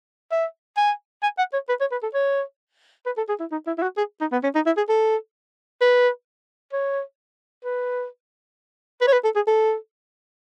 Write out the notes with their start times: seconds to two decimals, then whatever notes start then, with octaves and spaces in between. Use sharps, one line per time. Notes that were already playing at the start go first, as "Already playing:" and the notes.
0.31 E5
0.77 G#5
1.23 G#5
1.38 F#5
1.53 C#5
1.69 B4
1.80 C#5
1.92 B4
2.03 A4
2.14 C#5
3.06 B4
3.17 A4
3.29 G#4
3.40 E4
3.51 D#4
3.67 E4
3.78 E4
3.82 F#4
3.97 G#4
4.21 D#4
4.32 B3
4.43 C#4
4.55 D#4
4.66 E4
4.77 G#4
4.89 A4
5.81 B4
6.73 C#5
7.64 B4
9.01 B4
9.08 C#5
9.13 B4
9.24 A4
9.36 G#4
9.47 A4